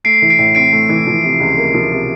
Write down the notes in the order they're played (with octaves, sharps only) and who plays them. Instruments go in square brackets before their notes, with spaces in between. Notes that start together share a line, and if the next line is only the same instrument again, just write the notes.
[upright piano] A3 [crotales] C7 D7
[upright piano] E3
[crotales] C7 D7
[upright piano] A2
[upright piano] C4 [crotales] C7 D7
[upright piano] A3
E3
F3
C3
C#2
A#3
F3
C3